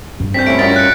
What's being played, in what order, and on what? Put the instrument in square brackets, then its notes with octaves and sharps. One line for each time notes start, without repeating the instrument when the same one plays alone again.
[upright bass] G2
[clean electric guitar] G3 C4 [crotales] G6 B6
[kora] A3 C#4 E4 [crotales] D7
[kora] G3 D#4 F4 [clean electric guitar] C#4 F#4 A#4 [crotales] A6 B6
[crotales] F#6 C#7